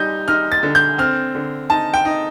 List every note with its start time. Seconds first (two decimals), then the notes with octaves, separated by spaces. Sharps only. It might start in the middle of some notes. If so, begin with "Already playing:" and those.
Already playing: G3 D#4 G6
0.28 D#4 F6
0.52 A6
0.63 D3
0.75 G6
0.98 C4 F6
1.35 D3
1.70 D#4 A5
1.94 G5
2.05 D#4